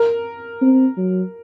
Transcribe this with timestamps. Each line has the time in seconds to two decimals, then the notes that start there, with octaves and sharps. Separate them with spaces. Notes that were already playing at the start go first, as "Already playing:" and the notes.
Already playing: A#4
0.62 C4
0.97 F#3